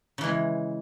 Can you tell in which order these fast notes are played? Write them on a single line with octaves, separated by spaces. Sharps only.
C#3 E3 G#3